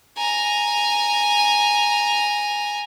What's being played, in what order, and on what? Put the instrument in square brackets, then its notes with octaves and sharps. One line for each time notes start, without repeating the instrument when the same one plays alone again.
[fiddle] G#5 A#5